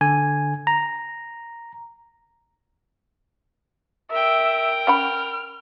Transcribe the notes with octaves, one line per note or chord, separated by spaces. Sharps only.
D3 G#5
A#5
A#4 E5 G5
C#4 F#5 B5 F6